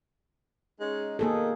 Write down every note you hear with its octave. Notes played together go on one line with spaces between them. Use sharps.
G#3 C#4 D#4
B2 D#3 A#3 G#4 A4